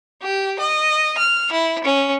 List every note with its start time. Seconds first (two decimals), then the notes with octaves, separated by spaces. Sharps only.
0.22 G4
0.59 D#5
1.18 F6
1.52 E4
1.84 C#4